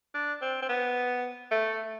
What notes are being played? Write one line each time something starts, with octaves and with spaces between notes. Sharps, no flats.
D4
C4
C4
B3
A3